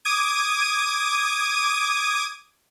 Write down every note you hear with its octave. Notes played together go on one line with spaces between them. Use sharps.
D6 D#6 G#6 D#7